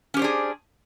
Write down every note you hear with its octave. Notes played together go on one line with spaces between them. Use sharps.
C#4 D4 G4 G#4 C5